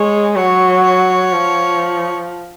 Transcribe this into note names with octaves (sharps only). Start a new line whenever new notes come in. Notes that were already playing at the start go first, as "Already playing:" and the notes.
Already playing: G#3 C#5
F#3 C#5
C#5
F3